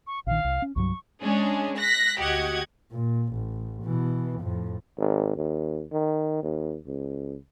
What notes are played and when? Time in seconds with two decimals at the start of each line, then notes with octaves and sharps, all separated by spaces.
0.07 C#6
0.27 A#1 D#3 F5
0.45 C2
0.62 C#4
0.76 C2 G2 F#3 C#6
1.23 G#3 C#4 D4 G#4
1.78 F#6 A#6 B6
2.18 D2 F#4 G4 D#5 F#5 G#6
2.92 A#2
3.34 A1
3.84 B2 E3
4.41 F2 A2
4.98 G#1
5.36 D#2
5.92 D#3
6.43 D#2
6.86 C#2